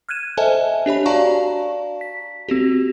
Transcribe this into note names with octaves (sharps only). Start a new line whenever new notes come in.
F6 F#6 G#6 D#7 E7
A4 C5 D#5 E5 G#5 A5
D4 G4 C#5 B5
F#4 D5 F5 A5 A#5 C#6
B6
C4 F#4 G4